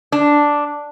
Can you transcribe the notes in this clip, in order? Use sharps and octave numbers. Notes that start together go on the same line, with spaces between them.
D4